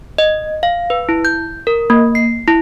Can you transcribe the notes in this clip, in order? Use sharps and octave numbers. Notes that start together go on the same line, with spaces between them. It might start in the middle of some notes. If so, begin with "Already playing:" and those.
D#5
F5
B4
E4
G6
A#4
A#3
C7
E4